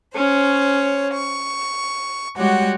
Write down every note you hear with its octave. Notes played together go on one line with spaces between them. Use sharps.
C#4 C5 C#5
C#6
G3 G#3 F#4 G4 C#5 F#5